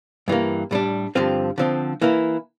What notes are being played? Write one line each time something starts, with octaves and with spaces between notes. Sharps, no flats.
G2 E3 A#3
A2 G3 D4
G2 D3 F3 C4 F4
D3 F3 C4
E3 A#3 E4